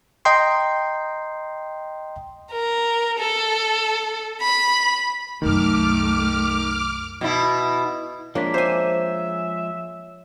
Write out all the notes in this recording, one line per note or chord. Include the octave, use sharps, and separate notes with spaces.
D#5 G5 A#5 C6
A#4
A4
B5
C2 F#2 D#3 A3 D6 F6
B2 E4
F3 G#3 A#3 D4 C#5 B6
C5 E5 G#5